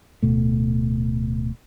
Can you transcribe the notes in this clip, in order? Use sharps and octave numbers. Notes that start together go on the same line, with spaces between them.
D1 B2 A3